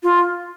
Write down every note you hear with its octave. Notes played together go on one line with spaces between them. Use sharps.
F4